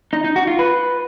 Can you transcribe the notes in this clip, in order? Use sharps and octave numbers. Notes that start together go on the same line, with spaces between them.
D#4
D#4
F#4
F4
B4